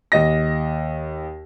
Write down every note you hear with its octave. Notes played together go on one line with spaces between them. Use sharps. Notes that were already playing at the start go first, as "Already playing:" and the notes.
D#2 D#5 A#6